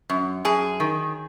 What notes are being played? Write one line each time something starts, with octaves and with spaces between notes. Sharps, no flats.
F#2
F#2 G#4
D#3